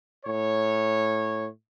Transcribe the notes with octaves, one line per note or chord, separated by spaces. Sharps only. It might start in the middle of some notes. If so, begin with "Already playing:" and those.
A2 C#5